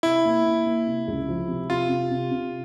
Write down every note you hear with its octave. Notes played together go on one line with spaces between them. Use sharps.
C3 E4
A#3
A#3
A#3
C3
C#2
F3
C3
C3 F4
C3
C3
C3